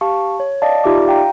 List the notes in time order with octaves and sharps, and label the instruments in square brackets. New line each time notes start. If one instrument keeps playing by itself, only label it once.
[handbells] G4 F5 A5 C#6
C#5
D5 D#5 F5 A5
D#4 F4 G4 D5 E5 D6
F5 G5 A#5